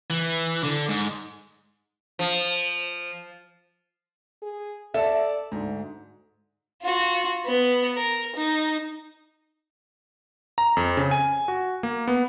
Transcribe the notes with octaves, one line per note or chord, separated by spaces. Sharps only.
E3
D3
G#2
F3
G#4
A4 D5 E5 A5
D2 G#2
F4 F#4
B3
A#4
D#4
A#5
F2
C#3
G#5
F#4
A#3
B3